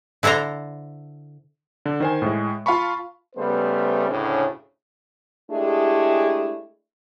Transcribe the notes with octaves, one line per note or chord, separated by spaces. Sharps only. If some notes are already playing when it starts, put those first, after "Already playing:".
D3 E4 A4 C5 A#5
D3
D#3 C5 G#5
A2 G#3
F4 F5 A5 B5 C#6
C#3 G3 A3 B3 B4 C5
D2 A2 C#3 C#4 D4
G#3 A3 D4 E4 G4 G#4